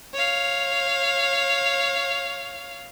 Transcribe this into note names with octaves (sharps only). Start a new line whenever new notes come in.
C#5 F5